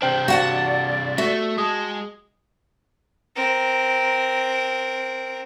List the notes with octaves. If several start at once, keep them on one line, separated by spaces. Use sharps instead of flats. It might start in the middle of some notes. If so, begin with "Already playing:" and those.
C3 D4 C5 G5 G6
F#4 D5 F5 F#5 A5
A3 F#4 E5
G#3 A5 D#6
C4 A#4